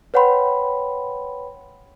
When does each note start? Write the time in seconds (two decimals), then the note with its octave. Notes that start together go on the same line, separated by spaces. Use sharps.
0.14 B4 C#5 F#5 G5 B5 C6